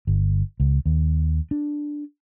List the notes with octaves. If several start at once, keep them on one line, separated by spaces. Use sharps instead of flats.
G1
C#2
D#2
D4